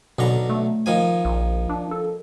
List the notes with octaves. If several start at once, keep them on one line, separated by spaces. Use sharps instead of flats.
B1 B2 D3 A#5
A3
D#3 F3 G#5
A#1
D4
A4